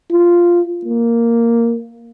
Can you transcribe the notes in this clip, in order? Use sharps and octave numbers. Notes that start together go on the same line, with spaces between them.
F4
A#3